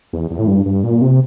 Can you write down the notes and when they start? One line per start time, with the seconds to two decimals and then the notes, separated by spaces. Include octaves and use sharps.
0.13 E2
0.31 E2
0.39 A2
0.47 G2
0.66 G2
0.84 A#2
1.01 C3